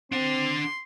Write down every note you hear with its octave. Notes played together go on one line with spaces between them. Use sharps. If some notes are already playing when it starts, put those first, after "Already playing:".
C4 D4 F#5 C6